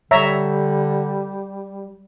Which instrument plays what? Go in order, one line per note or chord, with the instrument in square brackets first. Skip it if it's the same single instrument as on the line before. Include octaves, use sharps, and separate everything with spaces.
[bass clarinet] D3 [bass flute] G3 [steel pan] C#5 E5 A#5